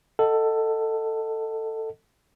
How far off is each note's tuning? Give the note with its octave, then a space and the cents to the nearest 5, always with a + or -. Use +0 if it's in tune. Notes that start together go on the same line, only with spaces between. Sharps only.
A4 +15 D#5 +0 F#5 +0